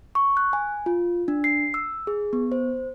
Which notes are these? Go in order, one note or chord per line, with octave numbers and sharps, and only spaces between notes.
C#6
F#6
G#5
F4
D4
C7
E6
G#4
B3
C5